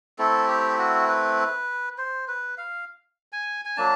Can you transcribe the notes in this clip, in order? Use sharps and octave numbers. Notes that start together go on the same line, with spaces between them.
A3 C4 E4 A4
G4
F#4
B4
C5
B4
F5
G#5
G#5
F#3 A#3 D4 A5